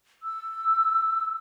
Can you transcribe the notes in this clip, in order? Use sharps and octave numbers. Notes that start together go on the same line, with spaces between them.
E6